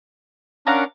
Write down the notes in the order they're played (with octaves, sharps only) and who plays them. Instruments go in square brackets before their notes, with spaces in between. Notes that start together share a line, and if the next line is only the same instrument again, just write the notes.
[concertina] C#4 D4 [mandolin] A#4 F5 F#5